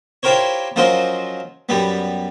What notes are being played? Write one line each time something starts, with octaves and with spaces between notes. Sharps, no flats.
E4 F4 G4 A#4 C5 C#5
F3 F#3 C#4 A#4 C5 D#5
F#2 G3 B3